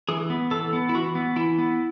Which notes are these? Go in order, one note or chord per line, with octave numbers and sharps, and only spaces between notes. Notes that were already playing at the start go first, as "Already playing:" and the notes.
E3 G#4
B3
E3 A4
B3
E4
E3 F#4
B3
E3 E4
B3